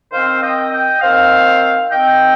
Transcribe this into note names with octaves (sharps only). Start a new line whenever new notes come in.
D#3 C4 C5 F5
D#5 G5
D#5 G5
D#3 C4 C5 F5
D#3 C4 D#5 G5